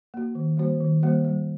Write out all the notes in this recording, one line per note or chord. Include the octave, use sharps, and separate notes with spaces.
A#3 F#4
D#3
G3 A#3 F#4 C5
D#3
G3 A#3 F#4 C5
G3